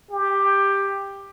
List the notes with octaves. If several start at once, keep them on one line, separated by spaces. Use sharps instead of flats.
G4